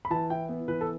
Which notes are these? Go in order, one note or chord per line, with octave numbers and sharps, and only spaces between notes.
B5
E3 A5
E4 G5
B3
E3 B4
A4